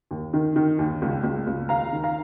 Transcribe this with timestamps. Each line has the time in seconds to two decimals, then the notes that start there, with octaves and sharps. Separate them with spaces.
0.11 D#2
0.34 D#3
0.56 D#3
0.79 D#2
1.02 C#2
1.24 C#2
1.47 C#2
1.69 D#2 F5 A#5
1.93 D#3
2.04 F5 A#5